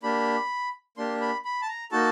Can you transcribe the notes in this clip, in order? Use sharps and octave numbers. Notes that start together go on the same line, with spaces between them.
A#3 D4 G4 B5
A#3 D4 G4 C6
B5
B5
A5
A#5
A#3 D#4 F#4 A4 A5